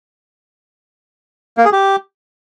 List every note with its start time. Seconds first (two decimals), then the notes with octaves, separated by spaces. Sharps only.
1.58 A#3
1.65 G#4
1.73 G4